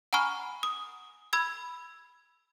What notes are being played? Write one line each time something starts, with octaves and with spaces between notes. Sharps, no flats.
F#5 G#5 A#5 B5 C#6 F6
D#6
B5 E6 G#6